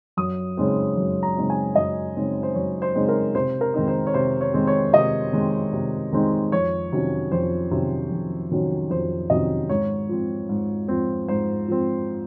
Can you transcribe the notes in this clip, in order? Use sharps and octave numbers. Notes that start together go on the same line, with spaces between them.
F#2 D#6
C#3 G#3 C4 D#4
F#2
A#5
C#3 G#3 C4 D#4
G#5
F#2 D#5
C#3 G#3 C4 D#4
C5
F#2 C#5
C5
C#3 G#3 C4 D#4
A#4
C3 C5
A#4
D#3 G#3 C4 D#4
C5
C#5
C3 C5
C#5
D#3 G#3 C4 D#4
C#5
C3 D#5
D#3 G#3 C4 D#4
C3
D#3 G#3 C4 D#4
F2 C#5
C3 D#3 F#3 C#4
F2 C5
C3 D#3 F#3 C#4
F2
C3 D#3 F#3 C#4
F2 C5
C3 D#3 F#3 C#4 D#5
G#2 C#5
F3 C4
G#2
F3 C4
G#2 C5
F3 C4